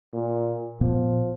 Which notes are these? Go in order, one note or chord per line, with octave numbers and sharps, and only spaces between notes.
A#2
A#2 F3 B3